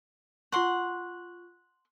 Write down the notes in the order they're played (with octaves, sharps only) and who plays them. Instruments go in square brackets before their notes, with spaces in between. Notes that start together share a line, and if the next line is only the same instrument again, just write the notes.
[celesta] F4 C#6 [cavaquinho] F#5 C6